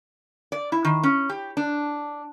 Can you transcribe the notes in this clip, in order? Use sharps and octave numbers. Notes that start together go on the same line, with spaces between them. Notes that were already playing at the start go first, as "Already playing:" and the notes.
D5
E4
D#3
C#4
G4
D4